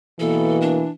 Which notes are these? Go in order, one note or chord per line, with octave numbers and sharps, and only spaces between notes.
B2 E3 A#3 A4
D4